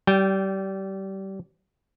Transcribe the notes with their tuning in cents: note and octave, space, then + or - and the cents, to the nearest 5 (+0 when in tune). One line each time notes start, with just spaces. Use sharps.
G3 -25 G5 +0